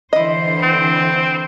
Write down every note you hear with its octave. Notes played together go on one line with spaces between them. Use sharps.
D3 E3 E4 C5 D#5
C4